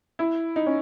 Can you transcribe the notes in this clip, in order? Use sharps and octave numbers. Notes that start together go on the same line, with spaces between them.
E4
D#4
C#4